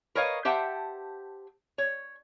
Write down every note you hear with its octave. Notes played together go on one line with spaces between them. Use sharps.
A#4 B4 C#5 D#5 F5
G4 C5 E5 F#5 G5 A5
C#5